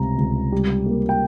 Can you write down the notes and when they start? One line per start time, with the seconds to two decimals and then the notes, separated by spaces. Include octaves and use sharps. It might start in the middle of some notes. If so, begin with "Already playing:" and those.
Already playing: C#2 C3 G3 A#5
0.19 C#2
0.52 G3
0.86 A#3
1.09 G5